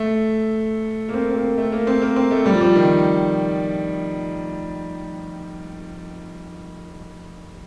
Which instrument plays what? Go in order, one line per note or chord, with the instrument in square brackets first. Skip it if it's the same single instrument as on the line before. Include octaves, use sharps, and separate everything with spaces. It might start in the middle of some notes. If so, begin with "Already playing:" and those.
Already playing: [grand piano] A3
A#3
C4
C4
A#3
A3
A#3
C4
A#3
C4
A3
G3
F3
G3
D#3